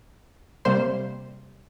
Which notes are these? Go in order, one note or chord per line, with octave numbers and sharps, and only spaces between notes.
C3 G3 A#3 C5 C6